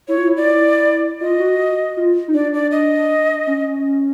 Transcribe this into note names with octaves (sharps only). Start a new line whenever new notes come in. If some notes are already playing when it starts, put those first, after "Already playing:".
E4 C#5
F4
E4
D5
F4 D#5
F#4
F#4
F4
D#4
D4 D5
D5
D#5
C#4